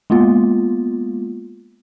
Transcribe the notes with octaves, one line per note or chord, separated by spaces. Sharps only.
G#3 A#3 B3 F4